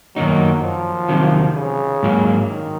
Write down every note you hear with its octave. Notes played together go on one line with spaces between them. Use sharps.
F#2 D#3 F#3 A#3 D#4
F3
C3 D#3 F#3
C#3
G#2 F#3 A#3
D#3